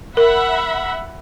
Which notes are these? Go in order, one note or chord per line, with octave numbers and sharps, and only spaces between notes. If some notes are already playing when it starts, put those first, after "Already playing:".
A#4 E5 F#5 B5